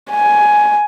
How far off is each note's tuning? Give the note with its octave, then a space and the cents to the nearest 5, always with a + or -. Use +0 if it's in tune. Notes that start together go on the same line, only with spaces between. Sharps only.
G#5 +10